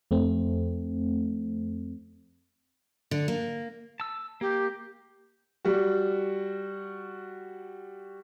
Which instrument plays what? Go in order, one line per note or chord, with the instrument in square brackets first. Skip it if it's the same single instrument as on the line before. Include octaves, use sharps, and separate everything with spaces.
[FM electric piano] F2 A3 C4
[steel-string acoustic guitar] D3
A#3
[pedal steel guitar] A5 E6
[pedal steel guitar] A#3 [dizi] G4
[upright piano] G3 F#4